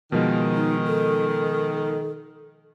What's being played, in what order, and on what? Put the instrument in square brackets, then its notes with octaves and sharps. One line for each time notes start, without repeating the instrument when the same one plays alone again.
[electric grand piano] B2 F3 G#3 [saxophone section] D#3
[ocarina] D#4
A4